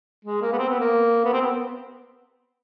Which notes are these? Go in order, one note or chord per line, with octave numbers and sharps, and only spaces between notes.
G#3
A#3
B3
C4
B3
A#3
B3
C4
B3